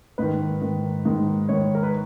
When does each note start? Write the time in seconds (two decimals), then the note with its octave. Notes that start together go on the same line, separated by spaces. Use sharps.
0.18 G#2 D#3 B4
0.61 G#2 D#3
1.05 G#2 D#3
1.49 G#2 D#3 C#5
1.75 A#4
1.83 B4